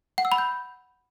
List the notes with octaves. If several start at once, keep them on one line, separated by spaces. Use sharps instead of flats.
F#5
E6
B5
G6